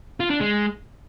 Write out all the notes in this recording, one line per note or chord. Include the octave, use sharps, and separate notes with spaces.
F4
D4
G#3